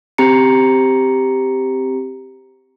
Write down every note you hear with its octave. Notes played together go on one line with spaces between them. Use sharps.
C4 G4 A#5 C#7